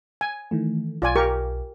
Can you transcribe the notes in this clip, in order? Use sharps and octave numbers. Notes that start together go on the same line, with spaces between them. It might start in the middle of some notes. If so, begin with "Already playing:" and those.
G#5
D#3 E3 A3
B1 F4 D5 G#5
G4 A#4 C#6